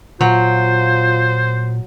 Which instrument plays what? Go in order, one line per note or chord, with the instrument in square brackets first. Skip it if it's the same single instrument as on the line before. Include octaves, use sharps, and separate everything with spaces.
[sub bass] A#2 [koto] F#3 [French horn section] F4 [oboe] C5